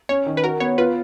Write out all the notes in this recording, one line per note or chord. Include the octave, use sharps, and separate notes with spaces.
C#4 C#5
D#3
B4
F#4 A#4
B3 C#5
F4 B4